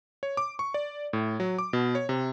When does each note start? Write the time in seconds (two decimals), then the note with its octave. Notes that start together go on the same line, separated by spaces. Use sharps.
0.23 C#5
0.37 D6
0.59 C#6
0.74 D5
1.13 A2
1.40 F#3
1.59 D6
1.73 B2
1.95 C#5
2.09 C3